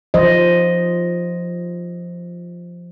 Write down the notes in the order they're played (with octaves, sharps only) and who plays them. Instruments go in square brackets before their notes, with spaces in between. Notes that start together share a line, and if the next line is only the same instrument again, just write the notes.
[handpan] F3 C5 D#5